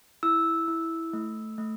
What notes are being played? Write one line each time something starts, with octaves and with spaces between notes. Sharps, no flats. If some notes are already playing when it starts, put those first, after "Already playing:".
E4 E6
E4
A3
A3